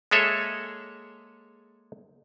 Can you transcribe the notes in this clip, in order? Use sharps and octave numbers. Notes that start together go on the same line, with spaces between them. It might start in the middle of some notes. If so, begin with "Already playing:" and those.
G#3 A#3 G#4 A4 C#5 E5